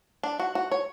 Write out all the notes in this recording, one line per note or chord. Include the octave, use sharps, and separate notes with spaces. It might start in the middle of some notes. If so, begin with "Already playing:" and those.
D4
F#4
F#4
C#5